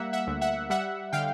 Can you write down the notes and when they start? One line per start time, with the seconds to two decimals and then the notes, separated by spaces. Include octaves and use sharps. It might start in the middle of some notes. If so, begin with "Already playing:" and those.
Already playing: G3 A#3 E5 F#5
0.13 E5 F#5
0.27 D2
0.41 E5 F#5
0.70 G3 E5 F#5
1.12 D3 F5 G5